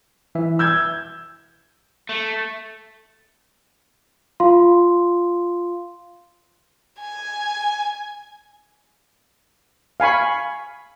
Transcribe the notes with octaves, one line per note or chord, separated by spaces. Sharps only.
E3 E5
E6 G6 G#6
A3
F4 F5 C6
G#5
F5 G#5 B5 C#6